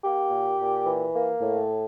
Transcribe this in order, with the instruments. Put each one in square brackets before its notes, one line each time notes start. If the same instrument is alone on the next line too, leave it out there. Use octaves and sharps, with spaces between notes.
[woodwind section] A#3 G4
A#2
A#2
E3
A#3
A2